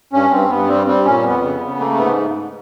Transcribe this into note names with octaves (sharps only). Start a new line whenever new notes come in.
G2 C#4
G2 C4
G2 B3
G3 C4
G3 C4
A#2 C#4
F2 B3
C#3
C#3
A3 A#3
G#2 B3